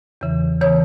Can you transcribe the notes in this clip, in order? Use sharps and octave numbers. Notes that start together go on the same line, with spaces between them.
E2 C#3 E3
C#3 E3 C#5